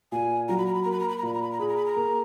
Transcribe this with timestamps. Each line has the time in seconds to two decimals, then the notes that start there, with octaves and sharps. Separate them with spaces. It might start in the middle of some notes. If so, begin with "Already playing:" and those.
0.12 A#2 G#5
0.48 F#3 A#5
0.58 B5
0.66 A#5
0.75 B5
0.83 A#3 A#5
0.92 B5
1.00 A#5
1.09 B5
1.18 A#5
1.23 A#2 B5
1.34 A#5
1.43 B5
1.52 A#5
1.59 G#4 B5
1.68 A#5
1.77 B5
1.86 A#5
1.96 A#3